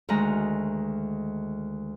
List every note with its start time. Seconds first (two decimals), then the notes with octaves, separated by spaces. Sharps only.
0.09 D2 D#3 G#3 A#5